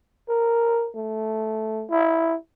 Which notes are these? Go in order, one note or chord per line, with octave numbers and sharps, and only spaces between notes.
A#4
A3
E4